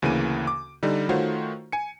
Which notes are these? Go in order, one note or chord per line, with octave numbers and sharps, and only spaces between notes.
D2 C#3 E3 A#3 D#7
D6
D3 G3 D#4
D#3 A3 F4 F#4 C5 C#5
G#5 C#7